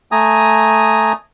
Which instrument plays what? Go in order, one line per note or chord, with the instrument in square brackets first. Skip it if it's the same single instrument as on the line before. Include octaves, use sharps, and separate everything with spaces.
[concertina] A3 G#5 A#5 D#6